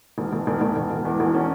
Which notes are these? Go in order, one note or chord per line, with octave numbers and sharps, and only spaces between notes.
E1
E1
E1
E1
E1
E1
E2
E1
C#4